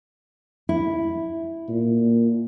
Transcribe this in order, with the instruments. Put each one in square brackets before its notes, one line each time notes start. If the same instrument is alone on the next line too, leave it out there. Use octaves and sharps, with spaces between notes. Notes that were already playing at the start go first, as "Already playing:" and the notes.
[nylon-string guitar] E4
[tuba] A#2